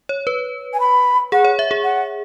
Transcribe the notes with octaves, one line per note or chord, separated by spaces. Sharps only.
C#5
B4
G#5
B5
G#4 F#5
C#5
E5
G#4
F#5